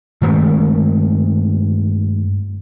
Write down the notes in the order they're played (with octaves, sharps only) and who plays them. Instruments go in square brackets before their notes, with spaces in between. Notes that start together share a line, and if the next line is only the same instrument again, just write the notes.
[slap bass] G2 D#3 G#3 A3